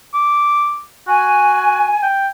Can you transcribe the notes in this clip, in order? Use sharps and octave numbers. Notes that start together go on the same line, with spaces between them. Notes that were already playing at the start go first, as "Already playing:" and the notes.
D6
F#4 G#5
G5